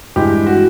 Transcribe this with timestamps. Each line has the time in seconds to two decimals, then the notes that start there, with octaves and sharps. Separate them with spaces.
0.16 G2 E3 G#3 G4
0.47 F#4